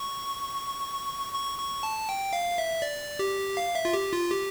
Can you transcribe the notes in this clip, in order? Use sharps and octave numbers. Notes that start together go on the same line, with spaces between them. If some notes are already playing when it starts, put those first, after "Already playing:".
Already playing: C#6
C#6
C#6
A5
G5
F5
E5
D5
G4
F5
E5
F4
G4
F4
G4